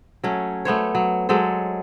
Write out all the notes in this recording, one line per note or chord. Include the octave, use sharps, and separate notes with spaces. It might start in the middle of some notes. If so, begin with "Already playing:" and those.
F#3 A3 C#4
A3 B3 C5 C#5
F#3
F#3 G#3 A4 C5